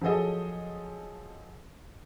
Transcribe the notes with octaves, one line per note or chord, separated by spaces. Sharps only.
F3 F#3 G#4 A4 D#5